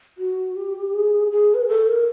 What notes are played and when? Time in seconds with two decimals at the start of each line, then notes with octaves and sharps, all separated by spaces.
0.18 F#4
0.56 G4
0.93 G#4
1.31 G#4
1.54 B4
1.61 A#4
1.69 A4
1.88 A#4